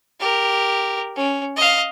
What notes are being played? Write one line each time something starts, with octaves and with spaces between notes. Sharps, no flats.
G4 A#4
C#4
D#5 F5